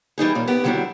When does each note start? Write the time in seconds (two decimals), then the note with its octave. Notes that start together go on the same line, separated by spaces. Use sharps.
0.18 E3 G3 D#4 G#4
0.35 A#2 C#4
0.47 B3 G4
0.64 D3 D#3 F#3 G3 D4 E4